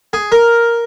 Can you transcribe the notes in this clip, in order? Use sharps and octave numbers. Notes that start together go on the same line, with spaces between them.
G#4
A#4